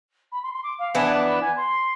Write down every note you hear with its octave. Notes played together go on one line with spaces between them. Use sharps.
B5
C6
C6
D6
F5
E3 B3 D4 G#5
A5
D6
B5
G#5
C6